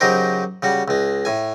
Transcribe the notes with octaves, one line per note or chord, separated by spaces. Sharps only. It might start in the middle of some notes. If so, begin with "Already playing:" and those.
C#3 F#3 D#4 G4 A#4 C5
C#3 G3 F#4
C#2 G#3
A2 G#5